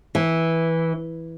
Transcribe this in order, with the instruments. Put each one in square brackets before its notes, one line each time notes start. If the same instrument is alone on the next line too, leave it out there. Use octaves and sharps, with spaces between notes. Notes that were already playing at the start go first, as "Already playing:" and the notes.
[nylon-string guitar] E3